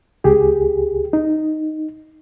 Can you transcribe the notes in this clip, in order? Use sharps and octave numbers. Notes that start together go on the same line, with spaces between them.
C#2 G4 G#4
D#4